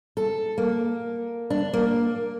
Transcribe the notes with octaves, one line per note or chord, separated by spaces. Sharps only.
A4
A#3
D4
A#3